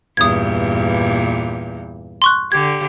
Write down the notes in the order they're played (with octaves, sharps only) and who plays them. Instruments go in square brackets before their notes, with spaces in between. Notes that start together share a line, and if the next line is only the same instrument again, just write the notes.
[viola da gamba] E2 G2 A#2 [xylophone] D#6 G#6
[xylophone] C6 C#6 F#6
[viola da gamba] D3 G4 [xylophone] G#6